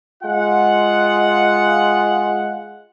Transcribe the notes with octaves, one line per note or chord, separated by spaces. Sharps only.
G#3 F4 F#5